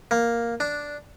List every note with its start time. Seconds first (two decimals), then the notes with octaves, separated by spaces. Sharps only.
0.11 A#3
0.60 D4